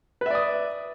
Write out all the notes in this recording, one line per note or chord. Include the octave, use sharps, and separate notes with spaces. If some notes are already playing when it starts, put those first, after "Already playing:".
B4 D5 E5 D#6